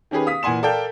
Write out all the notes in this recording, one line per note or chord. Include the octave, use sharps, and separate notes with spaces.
D#3 C#4 G4 G#4 B4
F5 D#6 B6
A#2 E3 F#5 G#5 C6 E7
A4 A#4 D5 F5 G5 G6